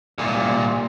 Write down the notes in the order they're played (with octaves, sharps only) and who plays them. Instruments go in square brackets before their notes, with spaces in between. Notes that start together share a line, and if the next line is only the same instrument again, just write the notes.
[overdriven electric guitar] C2 A#2